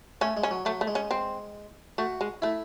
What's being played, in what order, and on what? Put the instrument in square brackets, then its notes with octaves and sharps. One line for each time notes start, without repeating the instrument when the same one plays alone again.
[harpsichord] A3 [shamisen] C#4
[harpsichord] G#3
[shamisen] C#4
[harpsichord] F#3
[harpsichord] F#3 [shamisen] A3
[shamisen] A3
[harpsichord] G#3
[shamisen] C#4
C4
[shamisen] A3 [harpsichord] F#4
[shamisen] G#3
[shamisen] A3 [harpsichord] E4